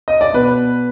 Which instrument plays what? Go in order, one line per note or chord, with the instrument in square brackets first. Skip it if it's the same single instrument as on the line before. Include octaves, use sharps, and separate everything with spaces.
[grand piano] D#5
D5
B2 B4